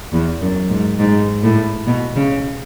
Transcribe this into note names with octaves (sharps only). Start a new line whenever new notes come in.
E2
F#2
G#2
G#2
A2
B2
C#3